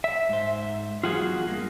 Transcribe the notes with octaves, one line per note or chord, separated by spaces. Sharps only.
E5
G#2 C5
E2 F#3 F4 F#4 G#4 F#5
G2 A#3